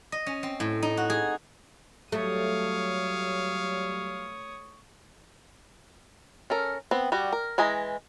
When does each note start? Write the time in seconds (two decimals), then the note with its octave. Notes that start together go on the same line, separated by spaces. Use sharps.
0.12 D#5
0.26 C#4
0.43 C4
0.60 A2
0.82 D#4
0.97 F#4
1.10 G#4
2.12 F#3 G3 A3 C#5 F5 D#6
6.50 C#4 A4 A#4
6.91 B3 C4
7.12 G3 F#4
7.33 A#4
7.58 E3 G#3 G#5 A#5